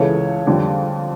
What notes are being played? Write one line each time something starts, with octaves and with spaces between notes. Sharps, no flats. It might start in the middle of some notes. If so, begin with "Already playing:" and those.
Already playing: C#2 C#3 E3 A4 C#5
F2 D3 G3